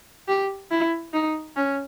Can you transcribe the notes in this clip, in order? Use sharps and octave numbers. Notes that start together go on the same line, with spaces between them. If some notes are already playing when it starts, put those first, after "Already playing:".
G4
E4
D#4
C#4